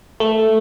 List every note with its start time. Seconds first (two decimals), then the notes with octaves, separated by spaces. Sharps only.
0.20 A3